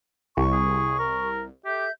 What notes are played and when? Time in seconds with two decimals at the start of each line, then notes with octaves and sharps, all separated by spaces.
0.37 C2 C#6
0.52 G#4
0.99 A#4
1.65 G4 A4 E5 G6